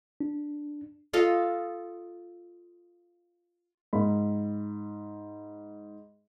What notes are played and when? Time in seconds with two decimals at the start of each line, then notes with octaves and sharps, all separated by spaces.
0.20 D4
1.13 F4 A4 D#5 F5
3.93 G#2 B5